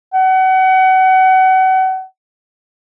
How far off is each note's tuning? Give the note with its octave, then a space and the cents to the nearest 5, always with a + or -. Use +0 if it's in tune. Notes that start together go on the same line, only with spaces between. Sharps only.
F#5 +30